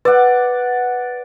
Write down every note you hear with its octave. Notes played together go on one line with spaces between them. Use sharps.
B4 D5 F#5